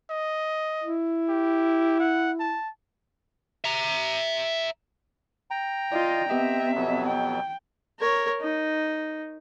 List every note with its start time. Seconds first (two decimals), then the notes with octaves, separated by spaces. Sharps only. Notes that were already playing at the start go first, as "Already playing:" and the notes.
0.10 D#5
0.83 E4
1.29 G4
2.00 F#5
2.40 A5
3.64 E5 A#5
5.51 G5 A#5
5.92 F4 D5 D#5
6.30 B3 C4 G4 D#5 E5
6.75 F2 B2 F#3
7.07 G5
8.00 A#4 C#5
8.41 D#4